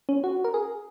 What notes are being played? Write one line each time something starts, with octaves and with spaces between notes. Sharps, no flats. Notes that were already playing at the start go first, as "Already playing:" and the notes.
C#4
F#4
A#4
G#4